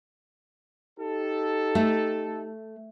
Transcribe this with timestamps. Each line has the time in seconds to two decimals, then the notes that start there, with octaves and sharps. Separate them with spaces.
0.99 D#4 G4 A4
1.75 A3